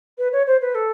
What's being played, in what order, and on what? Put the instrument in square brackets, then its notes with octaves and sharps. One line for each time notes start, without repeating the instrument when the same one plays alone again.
[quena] B4
C#5
C5
B4
A4